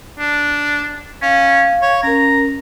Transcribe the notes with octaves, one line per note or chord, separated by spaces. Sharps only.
D4
C#4 F5
C#5
C#4 A#4 A#5